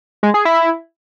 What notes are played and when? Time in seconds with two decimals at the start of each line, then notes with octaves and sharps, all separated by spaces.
0.23 G#3
0.34 G#4
0.45 E4